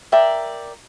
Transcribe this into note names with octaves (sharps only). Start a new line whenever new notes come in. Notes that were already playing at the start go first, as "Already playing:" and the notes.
A#4 D5 E5 G5